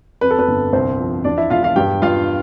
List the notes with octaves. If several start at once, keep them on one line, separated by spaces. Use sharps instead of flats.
F2 B4
A4
B3 B4
G1
C2 C4 C5
F3
E2 D4 D5
E4 E5
E1 F4 F5
F4 F5
G2 G4 G5
G2 F4 F5